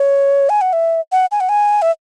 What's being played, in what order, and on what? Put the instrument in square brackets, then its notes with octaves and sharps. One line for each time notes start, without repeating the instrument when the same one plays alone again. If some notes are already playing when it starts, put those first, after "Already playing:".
Already playing: [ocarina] C#5
G#5
F#5
E5
F#5
G#5
F#5
G#5
E5